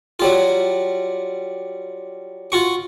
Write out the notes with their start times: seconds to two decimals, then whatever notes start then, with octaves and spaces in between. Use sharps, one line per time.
0.20 F#3 G3 F4
2.52 F4 F#4 C#6